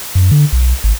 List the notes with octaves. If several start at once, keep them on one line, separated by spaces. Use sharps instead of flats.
F#2
D3
B1
G#1